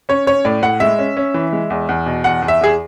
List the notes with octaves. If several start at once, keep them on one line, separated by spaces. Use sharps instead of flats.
C#4 C#5
C#4 C#5
A2 D5
A2 F#5
G#3 E5
C#4
C#4
E3
G#3
E2
E2
B2
E2 F#5
E2
E5
E2 G#4